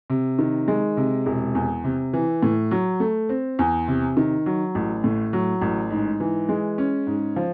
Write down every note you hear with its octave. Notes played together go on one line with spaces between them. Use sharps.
C3
D#3
G#3
C3
E1
E2
C3
E3
A2
F#3
A3
C4
E2
C3
D#3
F#3
A1
A2
F#3
A1
G#2
E3
G#3
C#4
G#2
F3